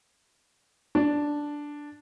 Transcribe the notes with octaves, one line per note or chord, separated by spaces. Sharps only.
D4